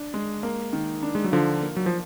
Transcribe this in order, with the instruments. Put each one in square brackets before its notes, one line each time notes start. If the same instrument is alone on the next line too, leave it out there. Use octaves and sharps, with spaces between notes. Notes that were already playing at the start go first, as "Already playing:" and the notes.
Already playing: [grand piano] D4
G#3
A#3
D#3
D4
[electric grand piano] G#3
F#3
[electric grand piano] D3 F3 [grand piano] F4
[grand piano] A#3
[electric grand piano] F#3
F3